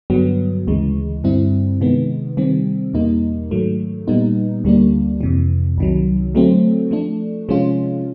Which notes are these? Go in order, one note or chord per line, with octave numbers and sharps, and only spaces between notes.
G2 D3 F#3 B3
D2 C#3 E3 G#3
G2 D3 G3 C4 E4
C3 D#3 G#3 B3
C3 D#3 G3 C4
E2 B2 G3 A#3 D#4
G#2 D#3 F#3 A3
A#2 G3 B3 D#4
D2 D3 G3 A#3 D4
F2 C3 E3
C2 C3 D#3 F#3
D3 F#3 A3 C4
F3 A3 D4
C3 F3 G#3 C#4 F4